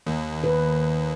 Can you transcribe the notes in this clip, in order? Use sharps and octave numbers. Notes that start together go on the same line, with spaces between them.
D#2
B4